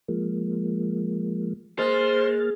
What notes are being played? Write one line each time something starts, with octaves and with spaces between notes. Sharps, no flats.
F3 G#3 A#3
G#3 A#3 C5 F6 A6